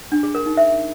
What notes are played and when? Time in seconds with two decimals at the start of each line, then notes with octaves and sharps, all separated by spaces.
0.12 D4
0.23 G#4
0.35 A#4
0.46 D#4
0.57 E5